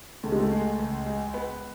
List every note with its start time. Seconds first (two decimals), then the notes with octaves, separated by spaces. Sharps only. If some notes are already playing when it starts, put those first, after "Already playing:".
0.23 C#2 A3
0.32 G#3
0.40 A3
0.51 G#3
0.79 C#2
1.06 G#3
1.34 B3